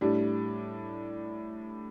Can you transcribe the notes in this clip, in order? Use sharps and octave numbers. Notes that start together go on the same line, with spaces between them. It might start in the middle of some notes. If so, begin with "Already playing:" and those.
A2 G3 D4